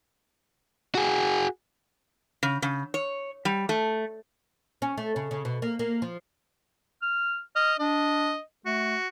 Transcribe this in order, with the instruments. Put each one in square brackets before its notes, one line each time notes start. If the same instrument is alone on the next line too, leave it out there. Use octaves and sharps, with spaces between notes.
[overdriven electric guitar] F#4 G#4
[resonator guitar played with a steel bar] C#3
C#3
C#5
G3
A3
[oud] C#4
A3
C#3
C#3
B2
A#3
A#3
F3
[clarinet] F6
[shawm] D#5 [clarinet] F6
[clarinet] D4 [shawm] D#5
[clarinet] A3 [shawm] F#4